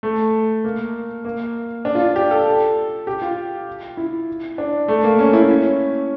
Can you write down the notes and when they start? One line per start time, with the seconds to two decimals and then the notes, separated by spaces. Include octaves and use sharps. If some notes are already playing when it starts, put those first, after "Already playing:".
0.03 A3
0.64 A#3
1.25 A#3
1.85 D4
1.95 F4
2.16 G4
2.31 A4
3.07 G4
3.22 F4
3.97 E4
4.58 D4
4.88 A3
5.04 A#3
5.19 C#4
5.33 E4
5.49 C#4